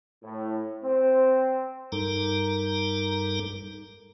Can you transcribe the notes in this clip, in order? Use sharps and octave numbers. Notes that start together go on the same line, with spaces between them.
A2
C4
G2 G3 D#4 A4 A#4 A#5